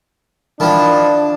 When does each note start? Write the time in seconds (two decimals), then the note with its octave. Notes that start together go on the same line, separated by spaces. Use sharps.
0.60 D#3 F3 D4 E4 A5